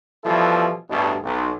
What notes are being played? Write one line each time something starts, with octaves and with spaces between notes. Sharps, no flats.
B2 E3 F3 G3 E4 A4
A1 D2 G2 B2
B1